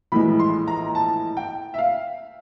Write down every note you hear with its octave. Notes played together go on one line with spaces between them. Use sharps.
A#1 A2 E3 G#3 B5
C6
A#5
A5
G5
E5
F5